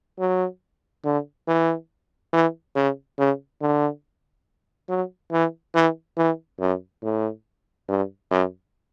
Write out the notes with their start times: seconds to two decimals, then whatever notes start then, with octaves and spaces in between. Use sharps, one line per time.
0.19 F#3
1.04 D3
1.47 E3
2.33 E3
2.76 C#3
3.18 C#3
3.61 D3
4.89 F#3
5.32 E3
5.75 E3
6.17 E3
6.60 F#2
7.02 A2
7.88 G2
8.31 F#2